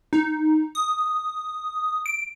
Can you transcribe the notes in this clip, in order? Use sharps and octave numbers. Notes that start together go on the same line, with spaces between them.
D#4
D#6
D7